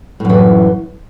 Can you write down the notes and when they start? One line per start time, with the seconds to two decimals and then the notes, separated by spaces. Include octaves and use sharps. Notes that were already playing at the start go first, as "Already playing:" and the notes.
0.20 A2
0.25 F#2
0.29 E3